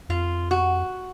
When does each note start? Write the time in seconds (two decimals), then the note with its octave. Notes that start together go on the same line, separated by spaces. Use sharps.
0.09 F2 F4
0.51 F#4